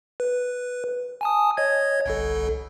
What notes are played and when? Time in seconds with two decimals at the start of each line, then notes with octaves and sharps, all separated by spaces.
0.20 B4
1.21 G#5 A5 D#6
1.57 C#5 D#5 G#6
2.06 G1 C2 A4